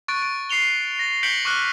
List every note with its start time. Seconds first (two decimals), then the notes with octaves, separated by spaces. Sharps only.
0.08 C#6 F#6 A6 D7
0.22 D7
0.50 C#6 C7 C#7 F7 G7
0.99 A#6
1.23 G6 B6 C#7 D7 F#7 G7
1.45 C#6 D6 F6 F#6